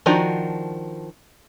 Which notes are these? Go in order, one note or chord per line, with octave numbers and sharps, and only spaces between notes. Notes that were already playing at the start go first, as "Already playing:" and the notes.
D#3 F3 D4 F#4 A#5